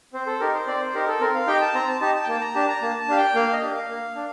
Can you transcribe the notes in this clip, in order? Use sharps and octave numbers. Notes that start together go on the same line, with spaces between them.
C4 C5
A4
D#4 G4 A#4
C5
C4 D5
C5
D#4 G4 A#4
A4
C4 A#4
F5
D#4 G4 G5
A5
C4 A#5
A5
D#4 G4 A5
A5
G5
A#3 A5
A#5
D4 G4 A5
A#5
A#3 A5
A5
D4 G4 F5
G5
A#3 F5
D#5
D4 G4
F5
A#3
D4